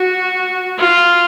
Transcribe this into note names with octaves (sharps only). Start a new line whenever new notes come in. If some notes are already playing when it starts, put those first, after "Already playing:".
Already playing: F#4
F4